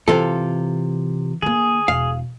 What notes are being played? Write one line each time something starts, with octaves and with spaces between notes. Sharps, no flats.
C3 E3 F4 A4
D3 A#3 G#4
E1 F5